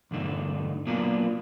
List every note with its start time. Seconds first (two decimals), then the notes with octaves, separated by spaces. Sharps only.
0.11 E2 G2 D3 A3 D#4
0.87 F#3 A#3 B3 D4 F4